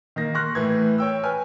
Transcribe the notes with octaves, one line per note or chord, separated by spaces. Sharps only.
D#3 A#3 A#6
C6 C#6 F6 F#6 A#6
A2 E3 G#6
C#5 G5 E6
B4 G#5 F6